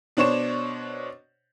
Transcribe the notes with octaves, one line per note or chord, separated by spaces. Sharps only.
B2 D4 C5 C#5 C#6 E7